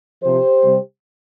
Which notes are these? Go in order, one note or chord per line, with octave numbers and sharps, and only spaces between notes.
C3 F3 G4 C5
C3 G3